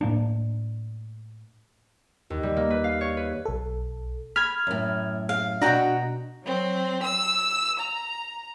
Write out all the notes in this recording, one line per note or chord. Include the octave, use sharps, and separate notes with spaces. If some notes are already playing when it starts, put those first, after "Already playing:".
A2 A#3 D4
D#2
G3
A#3
B4
F5
C#5
B4
B1 A4
B5 F6 G#6
F#2 A2
F5
B2 D4 F#4 F#5 G5 A#5
F#3 C4
E6
A#5